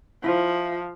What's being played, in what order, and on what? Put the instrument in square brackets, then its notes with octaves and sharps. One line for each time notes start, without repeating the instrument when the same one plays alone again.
[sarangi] F3 [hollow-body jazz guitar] E4 F4 C5